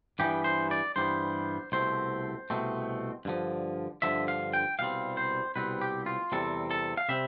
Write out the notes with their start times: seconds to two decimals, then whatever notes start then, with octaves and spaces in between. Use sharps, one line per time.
0.19 G2 E3 G3 B3 G4
0.44 C5
0.71 D5
0.96 G2 E3 G3 B3 C5
1.72 C2 B2 A3 C4 C5
2.50 C2 B2 A3 C4
3.25 G2 D3 F3
4.02 G2 D3 F3 E5
4.28 F5
4.53 G5
4.79 C2 B2 G3 C4 F5
5.17 C5
5.56 C2 B2 G3 C4 B4
5.81 G4
6.06 F4
6.32 E2 C3 G3 C4 A4
6.71 A4
6.97 F5
7.09 C3 G3 C4 E5